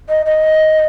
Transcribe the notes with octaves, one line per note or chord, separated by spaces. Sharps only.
D#5
D#5